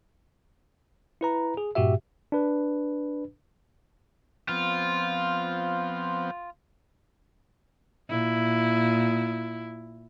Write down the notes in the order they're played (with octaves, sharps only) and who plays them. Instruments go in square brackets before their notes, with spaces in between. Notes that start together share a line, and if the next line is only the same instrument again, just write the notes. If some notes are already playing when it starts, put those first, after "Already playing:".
[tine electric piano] E4 B4 A#5
G#4
G2 A#2 F#4 G4 E5
D4 B4
[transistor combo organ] F3 B3 C4 [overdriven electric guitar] F4
[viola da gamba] A#2 E4